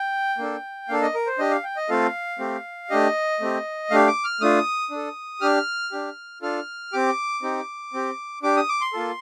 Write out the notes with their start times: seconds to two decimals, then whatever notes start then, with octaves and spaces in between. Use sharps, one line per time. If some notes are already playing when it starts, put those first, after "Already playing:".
Already playing: G5
0.38 A#3 D4 A4
0.88 A#3 D4 A4 F5
1.02 D#5
1.15 A#4
1.27 C5
1.39 D4 G4 D#5
1.51 F5
1.64 G5
1.77 D#5
1.89 A3 C4 F4 A4 F5
2.39 A3 C4 G4
2.90 A3 D4 G4 D#5
3.41 A3 C4 G4
3.90 A3 D4 G4 F5
4.08 D6
4.24 F6
4.41 A3 D4 F4 D#6
4.91 D4 A4
5.41 D4 G4 F6
5.92 D4 G4
6.42 D4 F4 A4 F6
6.93 C4 G4 D6
7.42 C4 D#4 G4
7.94 C4 G4
8.43 D4 G4 D6
8.56 D#6
8.69 D6
8.81 C6
8.93 A#3 F4 A4